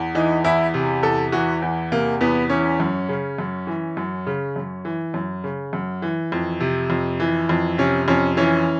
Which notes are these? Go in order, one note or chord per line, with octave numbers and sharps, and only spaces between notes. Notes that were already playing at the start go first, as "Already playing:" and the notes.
Already playing: E2
E3 D#4
E2 E4
C3
E2 A4
E3 F#4
E2
C3 A#3
E2 B3
E3 C#4
F#2
C#3
F#2
E3
F#2
C#3
F#2
E3
F#2
C#3
F#2
E3
F2
C3
F2
E3
F2
C3 C#4
F2 C#4
E3 C#4